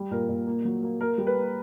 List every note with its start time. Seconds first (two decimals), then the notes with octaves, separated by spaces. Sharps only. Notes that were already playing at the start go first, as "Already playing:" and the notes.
Already playing: G3
0.11 A#2 A#4
0.29 A#2
0.47 A#3
0.65 F#3
0.83 A#3
1.00 A#3 A#4
1.18 G3
1.27 B4
1.36 A#3